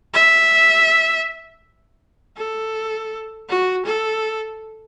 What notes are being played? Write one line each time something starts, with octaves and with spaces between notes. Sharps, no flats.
E5
A4
F#4
A4